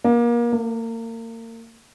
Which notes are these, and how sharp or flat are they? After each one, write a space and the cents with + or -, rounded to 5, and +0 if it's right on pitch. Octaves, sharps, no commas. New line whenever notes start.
A#3 +30
A#3 -35